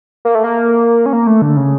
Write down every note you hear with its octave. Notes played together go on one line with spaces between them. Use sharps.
A#3
A3
A#3
C#4
A#3
A3
D3
C#3